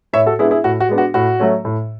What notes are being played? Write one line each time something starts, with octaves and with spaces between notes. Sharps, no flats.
A2 C#5 E5
F#4 A4
G#3 B3 D4 E4 G#4
E4 G#4
A2 F#4
F#4
G#3 B3 D4
F#4
A2 F#4
F#3 A3 C#4
A2